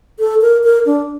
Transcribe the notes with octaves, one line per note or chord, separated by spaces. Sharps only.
A4
A#4
A#4
D4